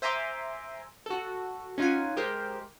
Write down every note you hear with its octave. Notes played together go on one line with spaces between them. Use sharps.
C5 E5 G#5 A#5 C6 D6
F#4 A4
C#4 D#4 F4 F#5 G#5
G#3 G4 A#4 C5